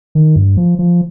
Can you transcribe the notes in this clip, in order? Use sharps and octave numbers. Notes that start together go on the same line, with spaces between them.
D#3
G2
F3
F3